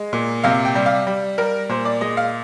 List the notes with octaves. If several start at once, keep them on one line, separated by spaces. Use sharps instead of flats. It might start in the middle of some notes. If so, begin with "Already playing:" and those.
Already playing: G#3
A#2
C3 F5
G5
G3
F5
G3
G3 A#4
A#2 C5
D5
G#3 D#5
F5